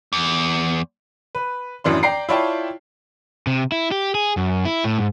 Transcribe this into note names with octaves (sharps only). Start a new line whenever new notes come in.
E2
B4
A1 F#2 E3 D4 C6
D5 G5 A#5 C7
E4 F4 C#5 D5 G5 A5
C3
E4
G4
G#4
F#2
E4
A2
G#2